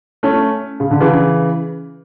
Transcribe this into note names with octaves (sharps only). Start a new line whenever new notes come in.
A3 C#4
C#3
D3
C#3 E3